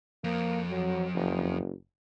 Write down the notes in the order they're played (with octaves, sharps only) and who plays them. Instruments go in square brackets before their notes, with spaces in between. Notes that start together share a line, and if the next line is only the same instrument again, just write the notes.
[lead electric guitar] F2 [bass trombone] A#3
[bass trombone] F#3
F#1